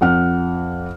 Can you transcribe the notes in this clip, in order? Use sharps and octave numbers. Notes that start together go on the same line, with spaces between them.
F2 F#5 F6